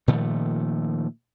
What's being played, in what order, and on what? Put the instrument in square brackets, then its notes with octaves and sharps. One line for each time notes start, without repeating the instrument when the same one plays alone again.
[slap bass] A#2 D#3 F3 A3